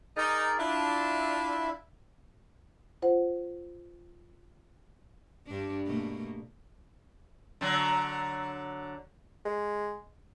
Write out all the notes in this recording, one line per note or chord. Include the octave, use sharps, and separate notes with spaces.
D#4 G#4 A#4 D5
D4 E4 F4 E5
F4 C5 F#5
G2 D4
B2 A3 A#3
D3 F#3
G#3